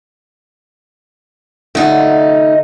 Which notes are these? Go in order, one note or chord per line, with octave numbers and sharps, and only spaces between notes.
D3 G3 A3 D#4 F#4